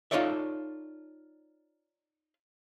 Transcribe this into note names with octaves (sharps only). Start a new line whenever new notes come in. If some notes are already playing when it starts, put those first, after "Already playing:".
D#4 F4 A4 C#5 D5 E5